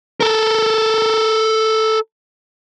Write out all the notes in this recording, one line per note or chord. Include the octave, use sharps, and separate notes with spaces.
A4 A#4